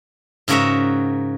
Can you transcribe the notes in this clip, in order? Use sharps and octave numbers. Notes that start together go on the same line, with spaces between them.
G#2 C#3 F#4 A#4 C#5 E5